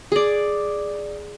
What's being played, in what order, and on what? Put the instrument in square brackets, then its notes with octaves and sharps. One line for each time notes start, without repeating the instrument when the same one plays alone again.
[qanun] G#4 D5